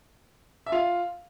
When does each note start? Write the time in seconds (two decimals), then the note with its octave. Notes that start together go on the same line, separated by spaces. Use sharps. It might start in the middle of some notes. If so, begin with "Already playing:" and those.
0.66 E5
0.72 F4 F5